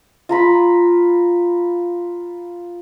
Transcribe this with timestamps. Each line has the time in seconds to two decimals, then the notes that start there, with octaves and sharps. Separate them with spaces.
0.29 F4 A#5 B5